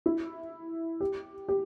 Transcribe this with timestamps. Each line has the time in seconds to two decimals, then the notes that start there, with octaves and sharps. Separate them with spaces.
0.06 E4
1.01 G4
1.49 G4